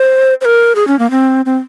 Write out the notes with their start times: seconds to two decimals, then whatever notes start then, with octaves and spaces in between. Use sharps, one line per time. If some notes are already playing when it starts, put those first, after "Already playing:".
Already playing: C5
0.41 C5
0.45 A#4
0.75 G#4
0.88 C#4
0.99 A#3
1.11 C4
1.45 C4